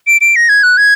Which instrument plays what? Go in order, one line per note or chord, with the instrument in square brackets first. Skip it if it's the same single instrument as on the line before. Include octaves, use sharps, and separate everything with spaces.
[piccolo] D7
D7
A#6
G#6
F#6
G#6